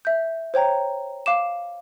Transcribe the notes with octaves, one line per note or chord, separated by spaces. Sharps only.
E5 G6
C5 C#5 G5 A#5
F5 D6 E7